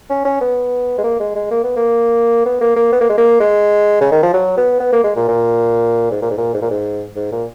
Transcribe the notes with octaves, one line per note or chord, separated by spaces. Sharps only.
C#4
C#4
B3
G#3
A#3
G#3
G#3
A#3
B3
A#3
B3
A#3
A#3
B3
A#3
G#3
A#3
G#3
C#3
D#3
F3
F#3
B3
B3
A#3
G#3
A#2
A#2
G#2
A#2
G#2
A#2
G#2
A#2
G#2
G#2
A#2